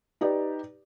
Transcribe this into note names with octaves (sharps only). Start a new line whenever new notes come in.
D#4 G4 B4 D5